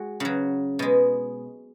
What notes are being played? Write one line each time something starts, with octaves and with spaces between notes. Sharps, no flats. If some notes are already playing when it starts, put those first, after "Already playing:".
Already playing: G#3 F#4
C#3 F#3
B2 G#3